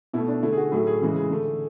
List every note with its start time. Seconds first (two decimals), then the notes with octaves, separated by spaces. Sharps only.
0.13 B2 E4
0.18 A3
0.28 D4
0.43 D3 A3 E4
0.53 G#4
0.57 F#4
0.72 A2 F#3 A3 G#4
0.87 G#4
1.01 C#3 E3 G#3
1.16 G#4
1.30 D3 A3